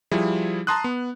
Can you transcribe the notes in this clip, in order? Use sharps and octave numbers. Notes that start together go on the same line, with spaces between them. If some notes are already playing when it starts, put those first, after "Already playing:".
F3 G3 E4 G#4
A5 A#5 C6 D#6 F#6
B3